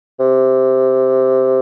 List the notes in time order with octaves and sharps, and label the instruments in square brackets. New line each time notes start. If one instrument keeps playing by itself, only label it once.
[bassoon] C3